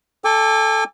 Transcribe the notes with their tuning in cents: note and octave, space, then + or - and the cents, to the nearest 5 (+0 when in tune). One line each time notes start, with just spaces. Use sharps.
A4 +0 G#5 -45 D6 +0